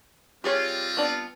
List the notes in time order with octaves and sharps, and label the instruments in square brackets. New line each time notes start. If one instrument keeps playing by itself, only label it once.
[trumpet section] G3 C4 F4 [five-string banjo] G4 G#4 C#5
[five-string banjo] B3 D4 D5